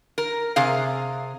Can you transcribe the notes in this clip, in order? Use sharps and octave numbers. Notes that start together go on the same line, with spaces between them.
A#4
C3 G#4 F5